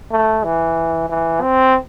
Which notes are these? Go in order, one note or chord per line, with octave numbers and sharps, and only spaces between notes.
A3
E3
E3
C4